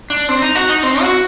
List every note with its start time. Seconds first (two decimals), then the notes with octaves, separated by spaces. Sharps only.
0.10 D4
0.29 C4
0.42 D#4
0.55 F#4
0.69 D#4
0.83 C4
1.02 F#4